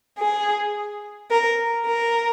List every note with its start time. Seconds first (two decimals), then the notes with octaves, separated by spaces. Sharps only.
0.20 G#4
1.30 A#4
1.86 A#4